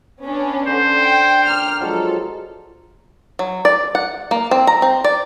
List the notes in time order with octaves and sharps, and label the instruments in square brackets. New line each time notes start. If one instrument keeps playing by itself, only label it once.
[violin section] B3 C#4 D4
[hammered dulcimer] D3 [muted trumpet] C5
[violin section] G5
[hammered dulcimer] A#4 D5 [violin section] G5 F6
[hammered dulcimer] F3 F#3 G#3 [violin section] A4
[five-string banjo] F#3
D5
F#5
A#3
C4
A#5
C4
D5